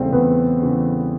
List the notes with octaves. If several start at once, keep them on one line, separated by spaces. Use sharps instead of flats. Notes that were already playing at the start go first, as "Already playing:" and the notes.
Already playing: E2 C#3 E3 G3 A3 C4 C5
E2 B3 B4
C#3 E3